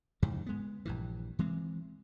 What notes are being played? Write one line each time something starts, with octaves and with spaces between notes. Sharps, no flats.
F2 G#2 C#3 E3
G#3 B3
A#1 G2 E3
E3 G#3 C4